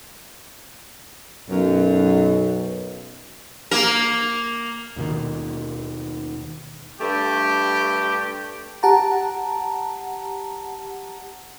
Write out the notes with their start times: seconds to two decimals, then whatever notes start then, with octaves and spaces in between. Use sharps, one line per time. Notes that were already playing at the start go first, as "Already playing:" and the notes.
1.50 B1 F#2
3.71 A#3 A#4
4.96 D#2 B2 D#3
7.00 G2 A3 G4
8.83 G4 F#5 A5 A#5